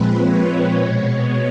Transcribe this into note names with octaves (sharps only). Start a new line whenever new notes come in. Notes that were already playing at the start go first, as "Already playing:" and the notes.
Already playing: A#2 F3 G#3 C4 B4
C#5
B2 G#3 B3